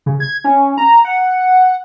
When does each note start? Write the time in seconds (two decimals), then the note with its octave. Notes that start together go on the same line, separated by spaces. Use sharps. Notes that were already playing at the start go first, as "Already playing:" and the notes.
0.06 C#3
0.20 G#6
0.44 C#4
0.78 A#5
1.05 F#5